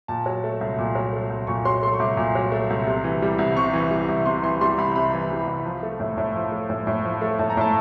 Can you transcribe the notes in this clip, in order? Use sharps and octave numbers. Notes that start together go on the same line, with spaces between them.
A#2 A5
F#3
A3
C2
A#2
F#3
A3
C2
A#2 C#6
F#3 C6
A3 C6
C#6
C2 D6
A#2
F#3
A3
C2
C3
E3
G3
C2
C3 C#6
E3
G3
C2
C3 C6
E3 C6
G3 C6
C2 B5
C3 B5
E3
G3
C2
F3
A3
A2
A2
F3
A3
A2
A2
F3
A3
A2 A5
A#5
A2 A5